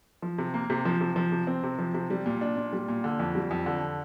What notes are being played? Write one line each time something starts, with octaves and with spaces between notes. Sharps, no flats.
F3
C3
A#3
C3
F3
C3
F3
C3
C4
C3
F3
C3
G3
A#2
D4
A#2
G3
A#2
D3
F2
G3
F2
D3